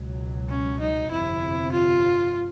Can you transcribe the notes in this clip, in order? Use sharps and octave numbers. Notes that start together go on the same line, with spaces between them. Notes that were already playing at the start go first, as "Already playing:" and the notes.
Already playing: C#2 B2 F#3
C#4
D#4
G1 F2 C3 E4
F4